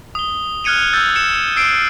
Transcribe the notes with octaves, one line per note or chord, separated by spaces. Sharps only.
D#6 G7
F6 F#6 G#6 C#7 D#7 F7
E6 G6 A6
C#7 E7
E6 C7 D7